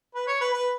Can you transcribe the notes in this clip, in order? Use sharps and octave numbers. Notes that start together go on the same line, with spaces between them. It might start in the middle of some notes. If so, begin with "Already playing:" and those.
B4
C#5
B4
B4